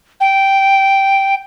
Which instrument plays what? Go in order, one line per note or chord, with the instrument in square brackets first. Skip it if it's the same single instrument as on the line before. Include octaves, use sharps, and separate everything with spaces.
[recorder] G5